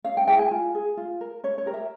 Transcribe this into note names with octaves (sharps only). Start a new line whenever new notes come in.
C#4 F5
G5
E4 G#4 G5
G#5
F4
G#4
F4
A#4
C#4 C#5
C#5
G4 A#4
E5